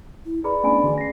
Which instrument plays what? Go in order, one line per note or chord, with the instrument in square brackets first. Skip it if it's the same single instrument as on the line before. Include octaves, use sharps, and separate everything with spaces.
[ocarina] E4
[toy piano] G#4 B4 B5 [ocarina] D5 [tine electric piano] A#5
[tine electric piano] A3 B3 D4 [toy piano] C#4 G#5 B5
[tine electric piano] D3 E3 [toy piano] F#4 G#4
[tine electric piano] A#6 C7